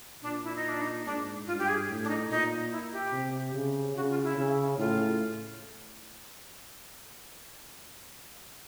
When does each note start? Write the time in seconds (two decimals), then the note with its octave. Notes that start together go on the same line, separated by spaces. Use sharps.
0.22 A#2 D4
0.43 E4
0.56 D#4
0.69 D4
0.81 D#4
1.05 G#2 D4
1.47 G2 F4
1.59 G4
1.68 G#4
1.88 A2
2.04 D4
2.09 D#4
2.30 A#2 D#4
2.71 E4
2.93 G4
3.12 C3
3.54 C#3
3.96 C#3 F#4
4.10 F4
4.23 E4
4.37 C#3
4.78 A2 F4